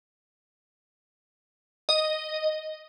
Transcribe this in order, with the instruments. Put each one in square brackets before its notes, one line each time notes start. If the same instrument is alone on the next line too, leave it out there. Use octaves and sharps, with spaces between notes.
[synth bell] D#5